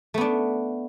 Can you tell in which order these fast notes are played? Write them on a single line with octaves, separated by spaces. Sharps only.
A3 B3 D4